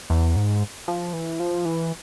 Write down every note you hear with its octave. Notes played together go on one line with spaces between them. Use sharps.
E2
G#2
F3
E3
F3
E3